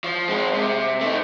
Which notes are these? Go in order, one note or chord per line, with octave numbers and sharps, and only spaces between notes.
F3
G#3 C4
C3
A3 D#4